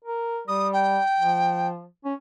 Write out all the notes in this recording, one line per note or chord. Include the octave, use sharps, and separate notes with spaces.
A#4
G3 D#6
G5
F3
C#4